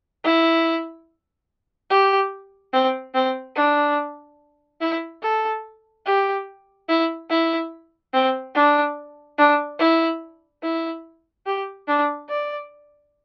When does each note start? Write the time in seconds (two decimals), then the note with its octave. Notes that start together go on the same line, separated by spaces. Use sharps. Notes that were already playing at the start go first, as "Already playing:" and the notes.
0.24 E4
1.90 G4
2.73 C4
3.15 C4
3.56 D4
4.81 E4
5.23 A4
6.06 G4
6.89 E4
7.30 E4
8.14 C4
8.55 D4
9.38 D4
9.79 E4
10.63 E4
11.46 G4
11.88 D4
12.29 D5